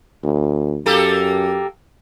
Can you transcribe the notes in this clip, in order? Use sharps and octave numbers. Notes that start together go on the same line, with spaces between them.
D2
F#2 A#3 G4 A4